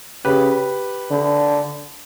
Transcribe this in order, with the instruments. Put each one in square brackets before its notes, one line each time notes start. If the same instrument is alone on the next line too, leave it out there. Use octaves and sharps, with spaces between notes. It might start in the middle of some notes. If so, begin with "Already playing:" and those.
[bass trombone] C#3 [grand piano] G4 B4
[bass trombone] D3